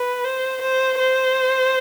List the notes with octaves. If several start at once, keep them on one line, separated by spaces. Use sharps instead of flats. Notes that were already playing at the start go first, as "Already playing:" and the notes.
Already playing: B4
C5
C5
C5